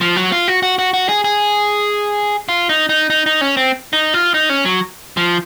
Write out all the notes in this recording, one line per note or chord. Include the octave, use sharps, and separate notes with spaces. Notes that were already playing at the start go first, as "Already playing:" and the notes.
F3
F#3
F4
F#4
F#4
F#4
F#4
G#4
G#4
F4
D#4
D#4
D#4
D#4
C#4
C4
D#4
F4
D#4
C#4
F#3
F3